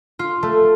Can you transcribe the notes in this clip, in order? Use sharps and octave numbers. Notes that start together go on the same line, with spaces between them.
F4
A3